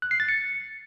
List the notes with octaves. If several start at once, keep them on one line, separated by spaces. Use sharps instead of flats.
F#6
C7
A6
C#7